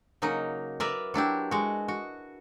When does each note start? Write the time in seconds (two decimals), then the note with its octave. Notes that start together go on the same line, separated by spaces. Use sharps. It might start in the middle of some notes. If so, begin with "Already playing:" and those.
0.22 C#3 F#3 A#3 D#4 D#5
0.80 A#4 B4 D5 E5
1.14 F#3 D4 E4 G4
1.51 G#3 F#4
1.88 F#4